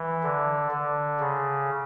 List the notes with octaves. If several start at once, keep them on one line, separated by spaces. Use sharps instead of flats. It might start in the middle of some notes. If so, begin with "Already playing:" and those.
Already playing: E3
D3
D3
C#3